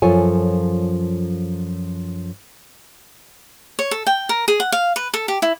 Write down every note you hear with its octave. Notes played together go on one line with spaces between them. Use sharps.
F#2 F3 F4 A4 C#5 G#5
C#5
A4
G5
A#4
G#4
F#5
F5
B4
A4
G4
E4